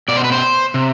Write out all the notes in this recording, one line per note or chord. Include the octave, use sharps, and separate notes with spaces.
B2 D5
C5
B4
C5
C3